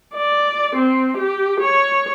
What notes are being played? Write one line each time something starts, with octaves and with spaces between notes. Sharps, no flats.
D5
C4
G4
C#5